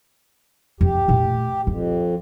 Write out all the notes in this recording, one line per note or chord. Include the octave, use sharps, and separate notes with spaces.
F2 G4
A#2 A3
F2 F3